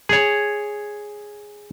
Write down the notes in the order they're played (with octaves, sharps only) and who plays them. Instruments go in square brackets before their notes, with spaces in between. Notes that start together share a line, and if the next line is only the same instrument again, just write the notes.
[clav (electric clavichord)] G#4 C#5